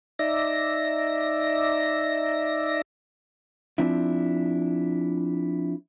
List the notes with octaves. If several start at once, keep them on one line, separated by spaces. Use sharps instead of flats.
D#4 D5 E5 A#6
F3 C4 D4 E4